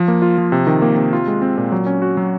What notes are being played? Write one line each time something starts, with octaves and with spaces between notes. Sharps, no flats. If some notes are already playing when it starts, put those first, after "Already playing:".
Already playing: F3
A#3
F4
F3
C3
D#3
A#3
C3
F4
G#3
C4
A#2
F#3
C#4
F#4
F#3